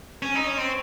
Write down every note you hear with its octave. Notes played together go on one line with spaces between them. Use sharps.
C#4
D#4
C#4
C4